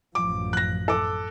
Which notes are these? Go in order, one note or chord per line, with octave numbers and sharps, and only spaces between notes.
A1 F#2 F3 D6
F#6 A#6
A4 D6